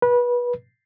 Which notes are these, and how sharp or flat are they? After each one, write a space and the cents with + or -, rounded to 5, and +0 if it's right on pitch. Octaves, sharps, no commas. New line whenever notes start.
B4 -25